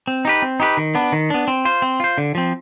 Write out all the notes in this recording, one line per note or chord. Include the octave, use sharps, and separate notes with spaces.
C4
D#4 G4 B4
C4
D#4 G4 B4
D#3
B3 D4
D#3
B3 D4
C4
F4 C5
C4
F4 C5
D3
F3 C4